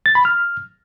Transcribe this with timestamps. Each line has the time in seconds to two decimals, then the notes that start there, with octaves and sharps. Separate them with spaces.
0.06 A6
0.15 B5
0.25 F6